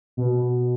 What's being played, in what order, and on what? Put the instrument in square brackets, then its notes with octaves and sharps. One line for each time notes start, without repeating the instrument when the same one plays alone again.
[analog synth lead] B2